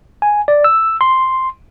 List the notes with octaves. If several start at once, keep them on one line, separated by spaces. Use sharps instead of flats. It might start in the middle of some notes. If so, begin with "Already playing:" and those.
G#5
D5
E6
C6